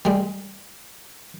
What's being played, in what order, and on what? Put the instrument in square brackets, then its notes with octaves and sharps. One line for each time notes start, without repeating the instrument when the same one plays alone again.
[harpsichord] G3 G#3